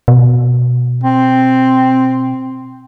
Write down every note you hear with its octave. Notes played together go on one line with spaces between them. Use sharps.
B2
C4